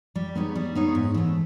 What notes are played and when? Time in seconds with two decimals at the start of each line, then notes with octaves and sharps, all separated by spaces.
0.16 G3
0.35 B3 D#4 G#4 C#5
0.55 G3
0.75 B3 D#4 G#4 C#5
0.95 G#2
1.14 E3 A3